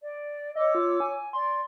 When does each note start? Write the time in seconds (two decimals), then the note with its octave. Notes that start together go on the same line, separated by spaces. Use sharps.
0.01 D5
0.55 C#5 D#5 D6 E6
0.75 F4
1.00 G#5
1.33 D5 C6